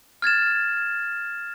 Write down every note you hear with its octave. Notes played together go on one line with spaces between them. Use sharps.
F6 G#6 A6 E7